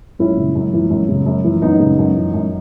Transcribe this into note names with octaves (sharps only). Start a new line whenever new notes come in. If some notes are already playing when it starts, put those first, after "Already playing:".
F#2 C#4 E4
C#3
F#2
E3
F#2
C#3
F#2
E3
F#2 B3 D#4
C#3
F#2
E3
F#2